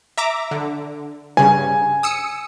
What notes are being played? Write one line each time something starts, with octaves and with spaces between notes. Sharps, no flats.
E5 A#5 D6
D3
G2 C#3 G#5
D#6 E6 C#7